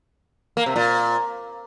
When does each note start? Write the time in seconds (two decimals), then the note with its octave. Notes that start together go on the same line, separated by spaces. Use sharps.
0.57 A#3
0.66 C3
0.76 A#2